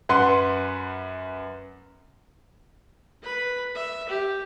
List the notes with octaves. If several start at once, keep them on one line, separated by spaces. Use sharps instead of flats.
F#2 B4 F#5 C6
B4 B5
E5
G4